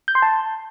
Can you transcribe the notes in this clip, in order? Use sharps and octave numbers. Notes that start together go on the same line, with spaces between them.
G6
C6
A5